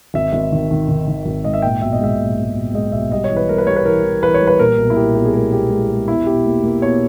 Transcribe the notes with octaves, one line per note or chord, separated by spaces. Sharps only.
G#1 E5
G#1
D#3
D#3
D#3
D#3
G#1
G#2 D#5
E5
A#2 G5
B1 E5
D#5
G#3 E5
A#2
G#3
B1
G#3 D#5
B1 E5
G3 D#5
C#5
E3
B4
G3 A#4
B4
G3 C#5
B4
E3 A#4
E3
E3 B4
C#5
G3
B4
A#2 A#4
B1
E4
A#2 G4
B1 G4
G#4
G#3 A#4
B3 G4
G#3 E4
G#3
E2 E4
B2 G4
A#3
A#3
B2 C#5